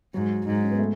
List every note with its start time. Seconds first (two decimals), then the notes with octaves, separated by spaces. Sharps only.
0.14 G#2 F#3
0.46 G#2 D#4
0.63 C#4
0.71 B3
0.79 A3